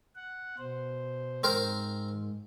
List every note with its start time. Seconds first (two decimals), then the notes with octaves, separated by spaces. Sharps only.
0.16 F#5
0.58 B2 C5
1.44 G#2 C4 A#4 C5